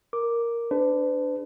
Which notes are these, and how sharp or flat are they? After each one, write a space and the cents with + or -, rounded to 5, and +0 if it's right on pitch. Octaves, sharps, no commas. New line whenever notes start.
A#4 +0 D6 +0
D4 +0 G#4 -10 B4 +45